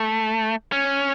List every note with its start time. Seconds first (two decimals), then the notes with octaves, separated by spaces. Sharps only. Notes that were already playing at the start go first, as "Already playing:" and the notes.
Already playing: A3
0.72 C#4